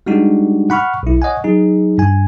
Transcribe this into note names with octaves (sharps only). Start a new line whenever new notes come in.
G3 G#3 D4 D#4 F#4 G4
F#5 B5 C#6 F6
B1 E4
C#5 D#5 F#5 G#5
F#3 D#4 G#4
G2 G#5